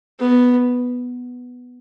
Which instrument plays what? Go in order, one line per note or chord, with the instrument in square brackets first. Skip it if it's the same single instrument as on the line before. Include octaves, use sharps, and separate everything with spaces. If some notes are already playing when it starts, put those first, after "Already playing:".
[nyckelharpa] B3